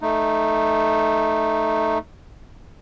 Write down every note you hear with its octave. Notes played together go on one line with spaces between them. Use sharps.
A3 D#4